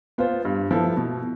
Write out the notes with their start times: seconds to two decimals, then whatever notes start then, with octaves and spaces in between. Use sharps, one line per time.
0.18 B3 F4 C5
0.45 G2
0.71 F3 B3 E4 A4
0.97 B2